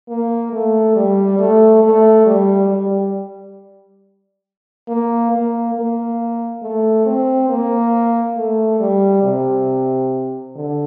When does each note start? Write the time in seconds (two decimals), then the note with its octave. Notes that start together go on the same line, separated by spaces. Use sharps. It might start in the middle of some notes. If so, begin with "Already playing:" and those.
0.08 A#3
0.52 A3
0.95 G3
1.39 A3
1.83 A3
2.26 G3
2.70 G3
4.88 A#3
5.31 A#3
5.75 A#3
6.62 A3
7.06 C4
7.49 A#3
8.37 A3
8.80 G3
9.23 C3
10.55 D3